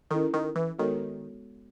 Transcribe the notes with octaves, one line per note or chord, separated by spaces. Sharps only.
D#3 C#4 E4 A4
D#3
E3
D#3 G#3 B3 F#4 A4 C#5